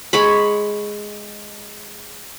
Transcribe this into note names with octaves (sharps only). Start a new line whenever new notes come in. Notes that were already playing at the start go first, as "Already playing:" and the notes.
G#3 C#5 B5